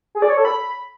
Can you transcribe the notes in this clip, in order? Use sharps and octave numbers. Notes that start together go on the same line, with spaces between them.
G#4
D5
C#5
A4
B5